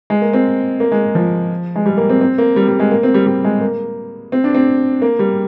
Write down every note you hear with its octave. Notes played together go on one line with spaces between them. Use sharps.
G#3
A#3
C4
A#3
G#3
F3
G#3
G3
A#3
C4
C4
A#3
G3
G3
G#3
A#3
C4
G3
G3
G#3
A#3
C4
D4
C4
A#3
G3